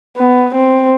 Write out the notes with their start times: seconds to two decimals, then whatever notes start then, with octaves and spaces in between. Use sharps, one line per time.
0.17 B3
0.54 C4